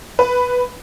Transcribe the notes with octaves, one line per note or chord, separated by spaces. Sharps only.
B4